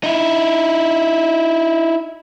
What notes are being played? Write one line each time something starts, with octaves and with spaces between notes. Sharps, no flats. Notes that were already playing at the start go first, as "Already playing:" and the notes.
D#4 E4